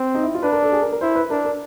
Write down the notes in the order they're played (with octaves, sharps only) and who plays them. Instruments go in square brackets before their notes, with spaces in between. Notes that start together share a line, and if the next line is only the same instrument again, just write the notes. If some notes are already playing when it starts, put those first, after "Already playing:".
Already playing: [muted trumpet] C4
[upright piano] D#4
E4
F4
[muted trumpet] D4 [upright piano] B4
[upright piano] A#4
A4
G#4
A#4
A#4
[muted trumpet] E4 [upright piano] C5
[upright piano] B4
[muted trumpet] D4 [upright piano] A#4
[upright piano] A#4